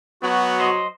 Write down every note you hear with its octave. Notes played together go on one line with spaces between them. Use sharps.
F#3 B3 F#4
C5 D#5